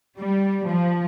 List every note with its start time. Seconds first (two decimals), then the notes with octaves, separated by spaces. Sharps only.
0.17 G3
0.66 F3